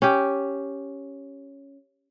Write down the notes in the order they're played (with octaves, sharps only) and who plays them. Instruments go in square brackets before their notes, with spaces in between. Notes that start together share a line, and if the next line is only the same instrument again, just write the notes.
[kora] C#4 G4